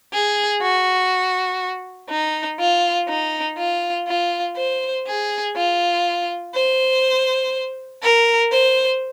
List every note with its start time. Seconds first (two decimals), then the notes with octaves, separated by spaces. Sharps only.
0.13 G#4
0.62 F#4
2.10 D#4
2.60 F4
3.08 D#4
3.58 F4
4.08 F4
4.57 C5
5.07 G#4
5.56 F4
6.55 C5
8.03 A#4
8.52 C5